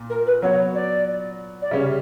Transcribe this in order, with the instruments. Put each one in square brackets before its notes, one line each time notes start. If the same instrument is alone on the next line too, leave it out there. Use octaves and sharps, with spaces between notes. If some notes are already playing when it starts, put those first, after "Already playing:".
Already playing: [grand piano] A#2
[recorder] A#4
B4
[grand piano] F#3 B3 F#4 [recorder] C#5
[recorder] D5
D5
[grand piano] C#3 G3 C#4 [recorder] E5